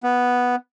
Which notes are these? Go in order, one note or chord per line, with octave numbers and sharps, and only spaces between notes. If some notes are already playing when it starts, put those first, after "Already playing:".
B3